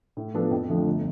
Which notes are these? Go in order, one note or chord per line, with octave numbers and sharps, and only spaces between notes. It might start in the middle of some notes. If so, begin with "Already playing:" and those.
A2
F3 B3 D4 A4
F2
D3 F3 A3
G1